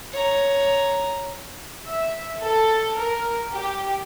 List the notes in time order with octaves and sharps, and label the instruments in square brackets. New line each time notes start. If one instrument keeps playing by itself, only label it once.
[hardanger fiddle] C#5 A#5
[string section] E5
A4
A#4
G4